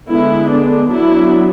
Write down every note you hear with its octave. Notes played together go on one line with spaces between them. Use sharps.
D3 G#3 B3 E4
D4
F#3 B3 D4 E4